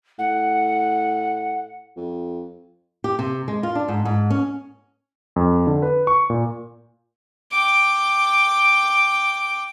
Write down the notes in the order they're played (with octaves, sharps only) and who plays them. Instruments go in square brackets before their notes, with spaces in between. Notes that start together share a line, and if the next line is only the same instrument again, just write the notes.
[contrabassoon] A2 [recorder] F#5
[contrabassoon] F2
[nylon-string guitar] G4
C3
G#3
F4
D4
G#2
G#2
C#4
[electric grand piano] F2
D3
B4
C#6
A#2
[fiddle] G5 D6